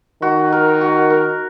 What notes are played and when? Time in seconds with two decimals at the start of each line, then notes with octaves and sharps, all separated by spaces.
0.22 D#3 F#4
0.53 A#4
0.81 F#4
1.10 A#4